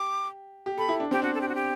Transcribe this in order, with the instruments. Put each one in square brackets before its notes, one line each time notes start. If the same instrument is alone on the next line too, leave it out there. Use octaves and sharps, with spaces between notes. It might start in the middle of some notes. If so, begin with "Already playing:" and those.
Already playing: [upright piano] G4 [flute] D6
[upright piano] G4
[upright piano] A4 [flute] B5
[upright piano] E4
D4
[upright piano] C4 [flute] G4
[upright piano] D4 [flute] F#4
[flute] A4
G4
F#4
G4